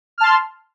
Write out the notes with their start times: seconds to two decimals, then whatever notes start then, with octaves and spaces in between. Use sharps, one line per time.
0.18 F6
0.21 A5
0.23 C6